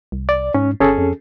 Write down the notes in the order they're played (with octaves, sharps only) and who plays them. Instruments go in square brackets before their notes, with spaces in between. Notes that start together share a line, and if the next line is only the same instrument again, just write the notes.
[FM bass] C2
[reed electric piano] D5
[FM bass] G#2 [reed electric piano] C#4
[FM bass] G1 [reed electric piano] C#4 G#4 A4
[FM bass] F2